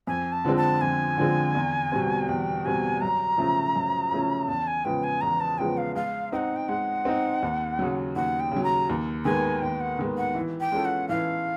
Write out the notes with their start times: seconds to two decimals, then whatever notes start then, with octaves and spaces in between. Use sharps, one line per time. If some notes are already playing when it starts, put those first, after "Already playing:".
0.07 F2 G#5
0.32 A5
0.45 D3 F3 G#3 C4
0.57 A5
0.81 F2 G#5
1.17 D3 F3 G#3 C4
1.55 E2
1.92 B2 G3 C4
2.28 E2 G5
2.65 B2 G3 C4 G#5
3.01 F#2 A#5
3.38 C#3 F3 A3 C#4
3.76 F#2
4.12 C#3 F3 A3 C#4
4.48 E2 A5
4.67 G#5
4.85 C#3 F3 G#3 B3 G5
5.04 G#5
5.21 E2 A#5
5.40 A5
5.58 C#3 F3 G#3 B3 G5
5.77 F5
5.95 G#3 F5
6.32 C4 D#4 F#5 G5
6.56 G5
6.68 G#3 F#5
7.05 C4 D#4
7.43 D#2
7.79 C#3 F#3
8.16 D#2 F#5
8.40 G5
8.51 C#3
8.57 F#3
8.64 A#5
8.89 D#2
9.25 D#3 G#3 B3 G#5
9.63 D#2 G5
9.80 F#5
9.99 D#3 G#3 B3
10.18 F#5
10.35 E3
10.60 G5
10.72 G#3 C#4 F4 A4
10.85 F#5
11.09 E3 F5